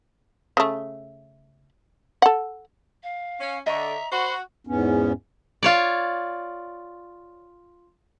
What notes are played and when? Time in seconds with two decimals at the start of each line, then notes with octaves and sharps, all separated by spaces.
0.57 C#3 A3
2.22 A4 F#5
3.03 F5
3.40 C#4
3.66 D3 D#5 E5 A#5 C#6
4.12 F#4 C5 B5
4.67 E2 G#2 B3 C#4
5.63 F4 C#5 D5